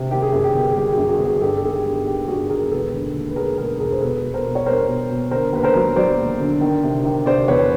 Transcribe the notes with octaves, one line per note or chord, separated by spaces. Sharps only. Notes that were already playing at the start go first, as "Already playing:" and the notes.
Already playing: C3
D#3 G4
G#4
F#2 G4
G4
G1
G#4
G3 G4
F#2 F#4 G#4
F#4 G#4
G1
F#4 G#4
G2 G4 A4
A4
D#3 G#4
G4
G2
D#3 G4
G2 F#4 G#4
D#3 G#4 A#4
E1 A4 B4
D3
D#2
B4
D#2 G#4 A#4
E1 G#4 A#4
E1 G#4 A#4
C5
B2 A4 B4
B2
A#4 C5
B2
C#5
G3 A#4 C5
B2
B2
D3 A#4 C5
D#2 B4
A#4 C5
F#3
F#3 C5 D5
D#2
D3
D#3
C3
D#3
C3 C5 D5
E2 B4 C#5